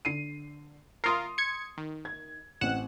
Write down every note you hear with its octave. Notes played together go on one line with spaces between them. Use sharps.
D3 C7 D#7
F4 A#4 C6 D#6 C7
G#6 C#7
D#3
G#6
A1 C4 F#5 F#6 E7